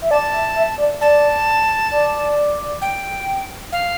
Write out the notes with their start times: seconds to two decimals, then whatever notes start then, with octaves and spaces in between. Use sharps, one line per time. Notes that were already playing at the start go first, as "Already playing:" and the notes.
0.02 E5
0.11 D5 A5
0.33 E5
0.56 E5
0.78 D5
1.01 D5 A5
1.91 D5
2.82 G5
3.72 F5